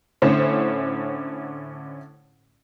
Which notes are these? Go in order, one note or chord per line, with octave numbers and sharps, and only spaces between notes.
A2 D3 C#4 E4 C5